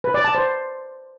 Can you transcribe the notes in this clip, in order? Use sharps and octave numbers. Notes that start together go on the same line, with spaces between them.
B4
D5
A5
C5